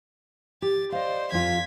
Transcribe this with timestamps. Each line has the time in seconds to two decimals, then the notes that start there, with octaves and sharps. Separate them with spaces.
0.62 G4 A6
0.92 C5 D5 D#5 F5
1.32 F2 F4 G#6 B6